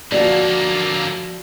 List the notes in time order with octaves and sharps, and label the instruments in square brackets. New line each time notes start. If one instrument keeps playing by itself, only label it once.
[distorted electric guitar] D3 A#3 [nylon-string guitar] F3 F#4 D5